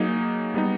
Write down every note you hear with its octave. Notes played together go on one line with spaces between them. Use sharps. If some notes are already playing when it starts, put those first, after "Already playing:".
Already playing: F#3 A#3 D#4 G#4
G3 B3 D#4